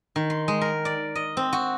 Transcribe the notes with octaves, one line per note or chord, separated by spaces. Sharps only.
D#3
C6
G#3
A#4
D5
D#5
C4
F#4